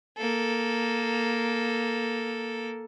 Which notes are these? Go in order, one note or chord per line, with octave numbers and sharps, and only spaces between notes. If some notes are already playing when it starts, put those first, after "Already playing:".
A#3 A4